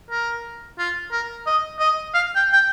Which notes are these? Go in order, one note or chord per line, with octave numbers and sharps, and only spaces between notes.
A#4
F4
A#4
D#5
D#5
F5
G5
G5